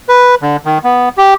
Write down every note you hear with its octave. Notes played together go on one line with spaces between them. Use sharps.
B4
D3
D#3
B3
G4